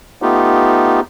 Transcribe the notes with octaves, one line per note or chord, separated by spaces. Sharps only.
A3 B3 D#4 F4 G4